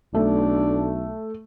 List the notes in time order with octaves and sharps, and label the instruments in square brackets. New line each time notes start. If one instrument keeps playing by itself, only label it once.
[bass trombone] B1 [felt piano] A3 [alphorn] D4